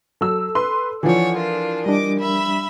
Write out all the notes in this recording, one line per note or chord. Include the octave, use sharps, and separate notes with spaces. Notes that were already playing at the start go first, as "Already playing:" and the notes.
F#3 A4 E6
B4 C6
E3 F3 D4 F4 C#5 F#5 G#5
D4 F4 A#4
G3 D4 D#5 D6
E5 B5